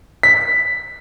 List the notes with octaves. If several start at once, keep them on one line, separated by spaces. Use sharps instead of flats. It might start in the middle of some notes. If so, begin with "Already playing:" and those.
B6